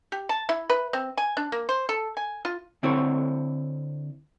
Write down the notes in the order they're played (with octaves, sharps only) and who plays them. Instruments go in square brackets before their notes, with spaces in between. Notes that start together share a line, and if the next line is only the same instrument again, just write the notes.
[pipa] G4
A5
E4
B4
C4
G#5
D4
A#3
C5
A4
G#5
F4
[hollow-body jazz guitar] D3 C4 E4 C5 C#5